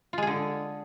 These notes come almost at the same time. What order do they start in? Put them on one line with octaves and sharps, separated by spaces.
F4 G#3 G#4 D3